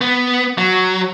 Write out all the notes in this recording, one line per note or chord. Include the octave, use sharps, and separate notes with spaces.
B3
F#3